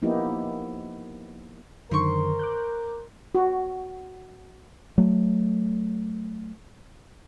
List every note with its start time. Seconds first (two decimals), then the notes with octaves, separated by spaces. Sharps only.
0.02 F3 A#3 B3 D#4 E4 G4
1.91 F#2 D3 D#3 A#4 C5 C6 C#6
2.39 D6 F#6 G6
3.35 F#4
4.98 F#3 A3